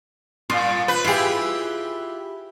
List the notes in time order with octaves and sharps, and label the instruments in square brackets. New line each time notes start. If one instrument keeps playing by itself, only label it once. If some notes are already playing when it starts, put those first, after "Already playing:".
[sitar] A#2 [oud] F4
[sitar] B4
[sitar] E4 G4 [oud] F4 G#4